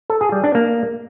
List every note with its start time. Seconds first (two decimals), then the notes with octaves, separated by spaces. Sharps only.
0.10 A4
0.21 G#4
0.32 G3
0.44 D4
0.55 A#3